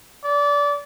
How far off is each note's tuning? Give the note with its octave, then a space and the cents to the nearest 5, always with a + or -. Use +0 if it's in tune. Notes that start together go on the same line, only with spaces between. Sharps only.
D5 -25